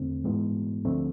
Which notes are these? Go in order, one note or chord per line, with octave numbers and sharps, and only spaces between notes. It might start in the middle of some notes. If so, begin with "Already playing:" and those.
Already playing: E2 D3 A3 C4
G#2 E3 G#3 B3
D2 D3 F3 A3 C4